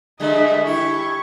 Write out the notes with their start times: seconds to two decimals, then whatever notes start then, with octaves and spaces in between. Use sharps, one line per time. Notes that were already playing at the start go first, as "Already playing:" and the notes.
0.20 D3 G3 G#3 D#5 E5
0.65 E4 G4 C#6